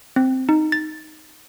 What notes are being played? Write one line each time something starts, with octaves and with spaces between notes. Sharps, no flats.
C4
D#4
A6